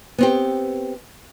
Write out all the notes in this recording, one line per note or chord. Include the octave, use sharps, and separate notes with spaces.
B3 C4 G4